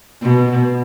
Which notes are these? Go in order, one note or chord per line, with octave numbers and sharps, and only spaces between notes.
B2